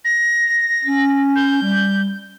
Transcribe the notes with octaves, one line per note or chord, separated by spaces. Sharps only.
A#6
C#4
G6
G3